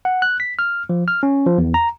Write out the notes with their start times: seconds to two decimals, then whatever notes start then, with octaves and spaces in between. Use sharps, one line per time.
0.05 F#5
0.22 F#6
0.40 B6
0.59 F6
0.89 F3
1.08 F6
1.23 C#4
1.46 F3
1.58 E2
1.74 A#5